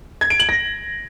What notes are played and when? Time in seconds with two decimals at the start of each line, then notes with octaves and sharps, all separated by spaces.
0.21 G#6
0.30 D7
0.40 F#7
0.49 A#6